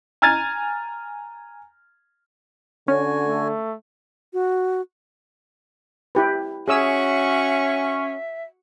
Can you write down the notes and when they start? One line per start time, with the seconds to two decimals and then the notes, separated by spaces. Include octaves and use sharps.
0.22 G#5 A#5 F6 G#6 A6 D#7
2.88 D3 C#4 F#4 G#5
3.26 A3
4.33 F#4
6.15 E4 G4 B4
6.68 C#4 F#4 G#4 C#5 E5 C#6 E6